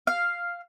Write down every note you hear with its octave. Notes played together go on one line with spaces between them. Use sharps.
F5